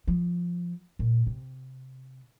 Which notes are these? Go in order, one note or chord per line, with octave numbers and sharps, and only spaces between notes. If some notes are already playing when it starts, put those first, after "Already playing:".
F3
A#2
C3